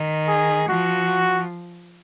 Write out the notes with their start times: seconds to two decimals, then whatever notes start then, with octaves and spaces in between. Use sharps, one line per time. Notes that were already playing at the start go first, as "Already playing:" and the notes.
Already playing: D#3
0.28 G#4
0.68 F3 F#4